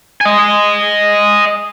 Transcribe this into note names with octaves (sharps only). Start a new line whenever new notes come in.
D#5 G#5